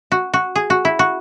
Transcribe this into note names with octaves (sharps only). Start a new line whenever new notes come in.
F#4
F#4
G#4
F#4
E4
F#4